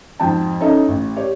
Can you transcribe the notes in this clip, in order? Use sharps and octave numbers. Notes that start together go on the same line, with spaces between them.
F2 G#2 F#4 G5 A5
C#4 D#4 E4 A4 D#5
A1
G4 C#5 D5